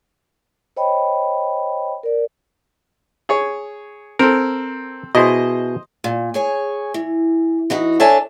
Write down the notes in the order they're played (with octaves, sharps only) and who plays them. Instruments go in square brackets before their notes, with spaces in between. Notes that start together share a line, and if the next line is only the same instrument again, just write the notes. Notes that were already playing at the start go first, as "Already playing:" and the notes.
[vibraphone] C5 C#5 D#5 G5 B5
A#4 D5
[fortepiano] G#4 C#5
[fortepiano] C4 A4 [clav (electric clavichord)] A#4 C5
[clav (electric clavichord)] B2 E4 G#4 [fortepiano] C5 D#5
[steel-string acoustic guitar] A#2
G#4 C#5 G#5
E3
E3 D#4 F#4
D4 A4 C#5 E5 G#5 A5